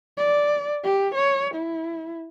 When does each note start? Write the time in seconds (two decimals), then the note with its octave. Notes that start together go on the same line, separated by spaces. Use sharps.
0.18 D5
0.84 G4
1.15 C#5
1.54 E4